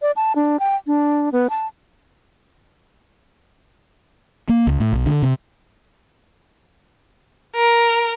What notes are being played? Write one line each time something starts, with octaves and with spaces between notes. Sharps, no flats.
D5
A5
D4
G5
D4
B3
A5
A#3
C#2
A2
B1
D3
C3
A#4